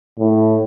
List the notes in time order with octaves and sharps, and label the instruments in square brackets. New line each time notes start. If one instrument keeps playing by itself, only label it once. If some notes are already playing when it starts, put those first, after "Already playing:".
[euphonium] A2